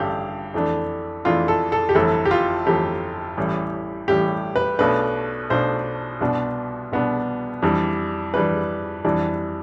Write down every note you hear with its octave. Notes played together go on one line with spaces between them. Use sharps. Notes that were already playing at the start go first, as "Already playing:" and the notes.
Already playing: A1 G2 D3 G4 F5
F2 E3 A3 D4
F2 E3 A3 D4 F4
A4
A4
G4
G1 F2 E3 A3 A4
G4
F4
G1 F2 E3 A3 G4
A1 A2 E3 G3
A1 A2 E3 G3 G4
B4
B1 B2 A3 D4 B4
B1 B2 A3 D4 C5
C2 B2 B3 D4
C2 B2 B3 D4
F2 E3 G3 D4
F2 E3 G3 D4 B4
F2 E3 G3 D4